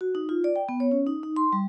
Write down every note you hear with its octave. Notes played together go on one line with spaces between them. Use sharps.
F#4
D#4
F4
D5
G5
B3
C#5
C#4
D#4
D#4
C6
G3